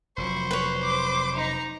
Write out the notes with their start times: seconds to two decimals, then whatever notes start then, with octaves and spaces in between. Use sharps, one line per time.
0.17 F1 F3 F#3 C5 B5 C#6
0.51 B4 C#5
0.83 D6
1.36 D#4 A#5